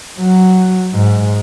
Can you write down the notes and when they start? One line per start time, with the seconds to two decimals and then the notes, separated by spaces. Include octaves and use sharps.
0.19 F#3
0.94 G#2